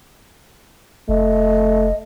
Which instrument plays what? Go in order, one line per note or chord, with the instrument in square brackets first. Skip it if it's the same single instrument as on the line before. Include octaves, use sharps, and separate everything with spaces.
[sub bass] F1 [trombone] A3 [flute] D#5